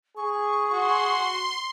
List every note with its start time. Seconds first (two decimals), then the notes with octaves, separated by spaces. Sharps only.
0.17 G#4 C#6
0.72 F#4 C6